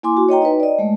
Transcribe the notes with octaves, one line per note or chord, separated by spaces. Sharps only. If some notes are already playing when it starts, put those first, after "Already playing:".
A#3 E4 G#5 C6 D6
F#4
C#5 D#5 G5 A#5
D#4 B4
D5 D#5
G#3 A3